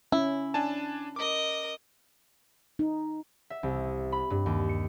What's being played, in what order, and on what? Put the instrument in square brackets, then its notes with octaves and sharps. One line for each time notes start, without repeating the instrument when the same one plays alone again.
[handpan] C#4 [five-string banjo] E4
[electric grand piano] D4 G#5 A5
[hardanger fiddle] A#4 D#5 [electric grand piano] D6
[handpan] D#4
[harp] E5
C2
B5
G2
D#2
C#7